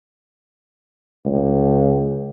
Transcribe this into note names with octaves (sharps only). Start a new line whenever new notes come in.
C#2